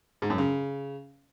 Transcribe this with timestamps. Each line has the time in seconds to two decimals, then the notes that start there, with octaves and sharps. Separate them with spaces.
0.22 G#2
0.30 F#2
0.38 C#3